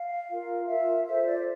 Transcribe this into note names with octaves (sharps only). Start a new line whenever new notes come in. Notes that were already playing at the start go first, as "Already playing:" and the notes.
Already playing: F5
F4 A#4
F4 A#4 E5
F4 A4 C5 E5
D5